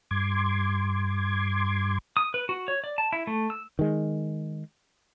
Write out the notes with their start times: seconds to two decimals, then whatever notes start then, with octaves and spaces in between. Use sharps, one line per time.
0.11 G2 C6 D6 G#6
2.17 D#6
2.34 B4
2.49 F#4
2.68 C#5
2.84 D5
2.98 A5
3.13 E4
3.27 A3
3.50 E6
3.79 D#3 G#3